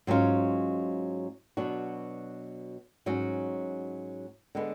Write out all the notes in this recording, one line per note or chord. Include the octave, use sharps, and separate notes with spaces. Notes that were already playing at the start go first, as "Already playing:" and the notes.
G#2 F#3 C#4 F4
B2 F#3 B3 D4 F#4
G#2 F#3 C#4 F#4
D3 G#3 B3